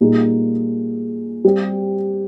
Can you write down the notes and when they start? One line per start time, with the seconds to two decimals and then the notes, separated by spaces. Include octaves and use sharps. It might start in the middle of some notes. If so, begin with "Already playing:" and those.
0.01 A#2 G3 A#3 D#4 G#4
1.45 G3 C4 G4